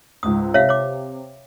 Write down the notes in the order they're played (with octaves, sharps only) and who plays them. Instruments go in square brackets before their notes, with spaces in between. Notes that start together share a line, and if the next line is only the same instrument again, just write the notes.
[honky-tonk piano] C#2 G#2 [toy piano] D#6
[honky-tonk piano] C3 [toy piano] C#5 E5 F5
[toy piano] C#5 D6